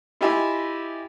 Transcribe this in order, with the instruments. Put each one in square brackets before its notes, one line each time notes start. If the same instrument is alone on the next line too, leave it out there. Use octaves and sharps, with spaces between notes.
[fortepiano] E4 F4 G4 D#5 E5 G#5